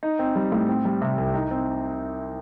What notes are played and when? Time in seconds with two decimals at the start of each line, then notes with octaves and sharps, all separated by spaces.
0.03 D#4
0.19 C4
0.35 G3
0.52 A2
0.69 C4
0.85 G3
1.01 C3
1.18 C2
1.34 D#4
1.51 C4